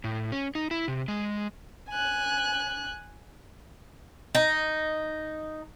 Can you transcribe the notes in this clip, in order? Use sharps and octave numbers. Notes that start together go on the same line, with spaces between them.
A2
C#4
D#4
E4
C3
G#3
G#5 F#6
D#4